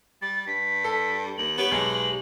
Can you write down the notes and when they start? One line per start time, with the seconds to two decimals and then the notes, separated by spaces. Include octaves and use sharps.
0.22 G3 A6
0.47 G2 B6
0.84 A4
1.38 D#2 F#7
1.58 B3 G4 B4 C#5
1.72 B1 G#3